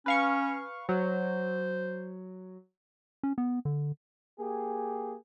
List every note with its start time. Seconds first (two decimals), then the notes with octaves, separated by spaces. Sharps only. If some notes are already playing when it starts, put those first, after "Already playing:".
0.06 C#4 B4 F5 C#6
0.89 F#3 C5
3.23 C#4
3.38 B3
3.65 D3
4.39 A#3 G4 G#4